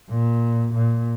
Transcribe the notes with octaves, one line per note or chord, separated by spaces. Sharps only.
A#2
A#2